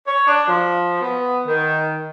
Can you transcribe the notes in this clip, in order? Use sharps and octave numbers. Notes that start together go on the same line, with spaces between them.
C#5
D4
F3
B3
D#3